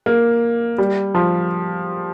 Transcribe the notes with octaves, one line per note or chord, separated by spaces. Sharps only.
A#3
G3
F3